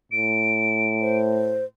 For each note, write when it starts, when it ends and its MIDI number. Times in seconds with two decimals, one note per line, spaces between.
0.12 1.66 45
0.12 1.17 98
1.01 1.64 72